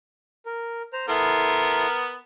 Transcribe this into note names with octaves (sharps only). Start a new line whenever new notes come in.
A#4
C5 A#5
B3 E4 A4 A#4 C6